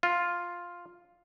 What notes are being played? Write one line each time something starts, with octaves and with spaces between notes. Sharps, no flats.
F4